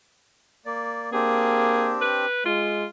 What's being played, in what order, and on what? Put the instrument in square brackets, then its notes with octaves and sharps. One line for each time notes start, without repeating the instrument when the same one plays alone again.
[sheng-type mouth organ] A#3 D5
[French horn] A#3 [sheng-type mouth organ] C4 D4 G4 [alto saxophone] G#4
[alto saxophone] B4
[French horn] G#3 [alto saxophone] F4